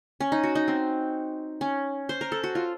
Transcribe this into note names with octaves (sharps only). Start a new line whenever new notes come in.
C#4
D#4
F#4
D#4
C4
C#4
C5
A#4
A4
F#4
F4